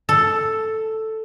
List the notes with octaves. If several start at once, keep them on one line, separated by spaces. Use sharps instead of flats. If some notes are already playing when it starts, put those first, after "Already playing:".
A4